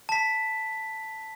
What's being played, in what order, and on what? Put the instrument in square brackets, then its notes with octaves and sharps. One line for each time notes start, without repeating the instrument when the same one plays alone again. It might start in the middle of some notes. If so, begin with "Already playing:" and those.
[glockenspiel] A5 B6